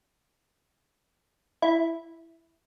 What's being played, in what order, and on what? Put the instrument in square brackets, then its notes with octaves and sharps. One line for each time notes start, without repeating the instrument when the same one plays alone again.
[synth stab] E4